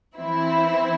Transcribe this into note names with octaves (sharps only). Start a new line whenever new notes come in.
E3 C4 E4